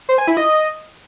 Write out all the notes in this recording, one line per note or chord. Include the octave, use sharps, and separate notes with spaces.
C5
G#5
E4
D#5